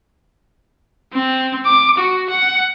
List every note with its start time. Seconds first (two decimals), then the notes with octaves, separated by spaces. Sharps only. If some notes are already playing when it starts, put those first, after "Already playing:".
1.13 C4
1.66 D6
1.98 F#4
2.30 F#5